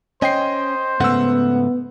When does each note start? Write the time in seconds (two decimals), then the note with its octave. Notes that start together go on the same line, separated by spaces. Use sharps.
0.22 C#4 C5 D#5 G5 C7
1.00 G#2 C#3 A3 B3 F#5 E6